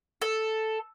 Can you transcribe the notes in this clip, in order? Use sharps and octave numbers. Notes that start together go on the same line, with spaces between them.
A4